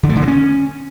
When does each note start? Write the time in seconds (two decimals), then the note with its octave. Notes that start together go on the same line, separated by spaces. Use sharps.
0.03 D3
0.09 A3
0.15 D3
0.21 A#3
0.28 C#4